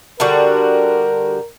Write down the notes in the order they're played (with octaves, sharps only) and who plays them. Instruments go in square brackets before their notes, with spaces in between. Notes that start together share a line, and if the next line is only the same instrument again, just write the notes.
[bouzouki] D3 G3 F#4 [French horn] A#4